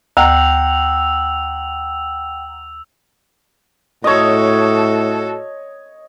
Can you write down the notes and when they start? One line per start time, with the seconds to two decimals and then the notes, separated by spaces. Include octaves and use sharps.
0.17 D2 F#5 G5 A#5 E6 F7
4.04 A2 F#4 A4 C#5 D#5